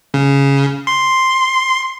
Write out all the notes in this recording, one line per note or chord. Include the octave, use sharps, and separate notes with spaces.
C#3
C6